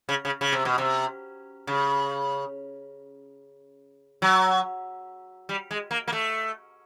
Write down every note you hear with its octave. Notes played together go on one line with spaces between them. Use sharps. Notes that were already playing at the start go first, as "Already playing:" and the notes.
C#3
C#3
C#3
C3
B2
C3
C#3
F#3
G3
G#3
A#3
A#3
A3